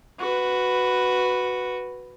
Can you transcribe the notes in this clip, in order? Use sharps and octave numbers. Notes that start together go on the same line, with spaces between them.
F#4 B4